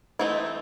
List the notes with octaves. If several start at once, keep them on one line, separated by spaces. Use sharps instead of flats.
E3 A3 C4 D#4 E4